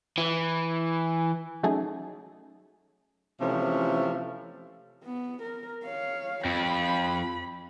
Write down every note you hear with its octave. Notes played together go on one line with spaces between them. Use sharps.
E3
F#3 A3 C#4 D#4 G#4 A4
C3 E3 F3 G#3 A3 C#4
B3
A#4
C#5 F5
F2 B5